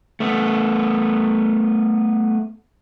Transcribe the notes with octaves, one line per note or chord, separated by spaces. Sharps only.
A3 B3